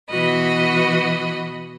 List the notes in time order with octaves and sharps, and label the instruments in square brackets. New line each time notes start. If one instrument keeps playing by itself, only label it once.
[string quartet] B2 E3 F#4 D#5 B5